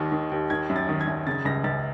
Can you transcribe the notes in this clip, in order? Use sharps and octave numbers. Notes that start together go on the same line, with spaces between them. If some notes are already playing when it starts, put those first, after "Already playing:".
Already playing: D#2 D#3
D#3
D#2
D#3 G#6
F#2
A6
D#3
G#6
F#2
C#3 A6
C#2 A#6
C#2 A6